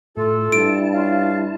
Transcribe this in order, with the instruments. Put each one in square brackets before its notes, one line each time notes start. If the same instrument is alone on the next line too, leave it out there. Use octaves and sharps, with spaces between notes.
[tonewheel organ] A2 [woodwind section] A3 F4 A4
[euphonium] G2 [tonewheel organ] E4 A5 [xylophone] D7
[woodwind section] C#4 F4 F5